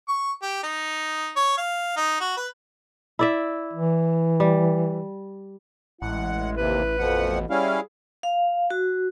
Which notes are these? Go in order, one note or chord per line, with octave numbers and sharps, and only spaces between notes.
C#6
G4
D#4
C#5
F5
D#4
F#4
B4
E4 D5 E5
E3
G3
A1 G#3 E4 F#5
D#2 C3 B4
F2 B2 F3 F#5
G3 C#4 E4 G#4 F5
F5
F#4